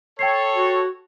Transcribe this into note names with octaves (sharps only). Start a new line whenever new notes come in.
A4 C#5 G5 C7
F#4